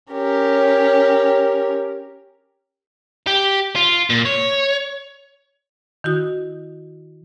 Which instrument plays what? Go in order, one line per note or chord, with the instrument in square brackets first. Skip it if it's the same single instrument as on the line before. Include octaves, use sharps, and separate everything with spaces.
[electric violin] C#4 A#4 [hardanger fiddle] G4 C#5
[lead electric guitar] G4
F4
A#2
C#5
[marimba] D#3 E4 F#4 D#6